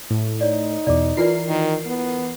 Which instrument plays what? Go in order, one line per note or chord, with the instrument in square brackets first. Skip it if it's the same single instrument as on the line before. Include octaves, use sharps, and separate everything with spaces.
[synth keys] A2
[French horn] D#4 [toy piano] C#5 D5
[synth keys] E2 B2 [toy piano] D5 D6
[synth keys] E3 A#4 C7 [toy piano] F4 D5
[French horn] D#3
B3